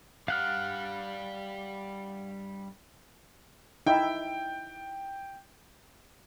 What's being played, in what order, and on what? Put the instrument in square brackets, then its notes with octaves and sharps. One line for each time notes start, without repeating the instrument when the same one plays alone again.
[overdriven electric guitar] G3 D4 [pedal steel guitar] F5 F#5 F6
[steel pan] D#4 E4 E5 [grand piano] G5